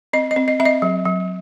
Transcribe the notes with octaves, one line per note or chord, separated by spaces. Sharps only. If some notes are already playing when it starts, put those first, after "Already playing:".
C4 D#5
D#5
C4
D#5
C4 E5
D#5
F#3
F#3